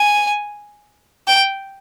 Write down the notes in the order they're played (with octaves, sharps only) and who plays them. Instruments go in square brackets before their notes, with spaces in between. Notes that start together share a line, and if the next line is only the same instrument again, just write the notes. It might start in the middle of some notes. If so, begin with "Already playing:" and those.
Already playing: [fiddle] G#5
G5